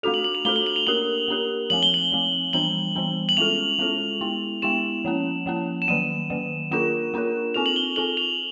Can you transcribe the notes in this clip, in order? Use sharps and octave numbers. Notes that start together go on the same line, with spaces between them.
A3 D4 F#4 A4 F7
F#7
F#7
F7
A3 D4 F#4 A4 G7
G7
F#7
F7
A#3 D4 G4 A#4 F#7
A#3 D4 G4 A#4
F3 A3 C4 F#7
G7
F#7
F3 A3 C4
E3 G3 B3 D4 F#7
E3 G3 B3 D4
F#7
G#3 C#4 F4 A4 F7
G#3 C#4 F4 A4
G#3 B3 E4
G#3 B3 E4 E7
F3 A#3 C#4
F3 A#3 C#4
E7
D#3 F#3 A#3 D#7
D#3 F#3 A#3
A#3 D4 F4 A#4 E7
A#3 D4 F4 A#4
C4 F4 A4 F7
F#7
G7
C4 F4 A4 F#7
F7